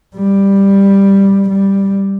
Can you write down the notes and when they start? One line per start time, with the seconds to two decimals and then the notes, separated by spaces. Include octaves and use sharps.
0.15 G3
1.50 G3